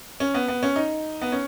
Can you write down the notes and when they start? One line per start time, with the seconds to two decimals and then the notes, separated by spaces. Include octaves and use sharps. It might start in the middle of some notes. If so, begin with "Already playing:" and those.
0.20 C#4
0.34 B3
0.48 B3
0.63 C#4
0.76 D#4
1.22 B3
1.32 C#4